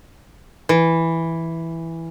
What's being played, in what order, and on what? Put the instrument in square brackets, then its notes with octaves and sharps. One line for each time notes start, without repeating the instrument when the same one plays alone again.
[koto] E3